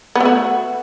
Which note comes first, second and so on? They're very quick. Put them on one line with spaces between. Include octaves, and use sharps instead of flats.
B3 A3 F#4